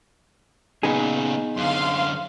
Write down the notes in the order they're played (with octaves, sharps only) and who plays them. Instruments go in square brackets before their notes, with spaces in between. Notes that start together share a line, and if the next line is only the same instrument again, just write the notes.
[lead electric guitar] A#2 C#3 [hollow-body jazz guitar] B3 D#4 G#4
[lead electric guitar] F#2 D3 [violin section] F5 C6